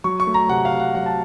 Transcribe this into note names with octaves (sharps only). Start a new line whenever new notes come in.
F#3 C#6
C#6
A3
A#5
C3 F#5
F5
C3
F#5
F#3 F#5
A5